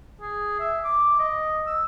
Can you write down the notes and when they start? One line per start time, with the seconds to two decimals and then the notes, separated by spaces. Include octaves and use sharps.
0.21 G#4
0.60 E5
0.85 D6
1.20 D#5
1.67 E6